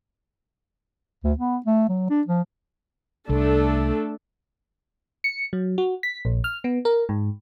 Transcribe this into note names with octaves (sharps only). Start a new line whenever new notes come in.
D2
B3
A3
F#3
D4
F3
C2 A3 D4 A4
C#7
F#3
F#4
B6
A#1
F6
B3
A#4
G#2